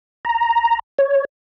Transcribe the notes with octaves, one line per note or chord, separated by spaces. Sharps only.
A#5
C#5